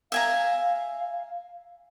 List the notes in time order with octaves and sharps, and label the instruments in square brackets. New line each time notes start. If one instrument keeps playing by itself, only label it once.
[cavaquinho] E5 G#5 A#5 [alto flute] F5